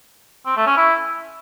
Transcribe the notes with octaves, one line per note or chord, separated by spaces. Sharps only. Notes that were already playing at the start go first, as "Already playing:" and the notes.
C4
A3
C#4
E4